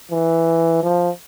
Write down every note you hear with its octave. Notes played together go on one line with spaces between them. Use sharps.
E3
F3